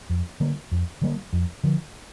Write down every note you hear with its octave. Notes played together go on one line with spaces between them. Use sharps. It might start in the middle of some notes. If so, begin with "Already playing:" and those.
F2
D3 G3 A#3
F2
D3 G3 A#3
F2
D3 F3